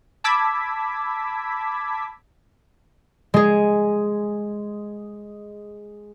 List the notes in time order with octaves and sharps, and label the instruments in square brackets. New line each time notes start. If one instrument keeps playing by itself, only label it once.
[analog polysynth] A5 B5 D6 E6 G#6 B6
[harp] G#3 G#4